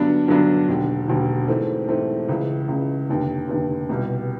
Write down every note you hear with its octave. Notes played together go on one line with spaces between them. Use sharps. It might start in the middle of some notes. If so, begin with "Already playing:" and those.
Already playing: G2 D3 F#3 B3 D4
G2 D3 F#3 B3 D4
E1 D#2 D3
E1 D#2 D3
G#2 E3 A3 C4
G#2 E3 A3 C4
C#2 C#3 E3
C#2 C#3 E3
F1 D#2 D3
F1 D#2 D3
C2 B2 G3